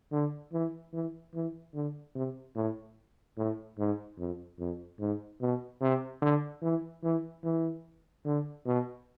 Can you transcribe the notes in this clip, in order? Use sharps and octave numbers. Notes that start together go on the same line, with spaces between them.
D3
E3
E3
E3
D3
C3
A2
A2
G#2
F2
F2
G#2
B2
C3
D3
E3
E3
E3
D3
B2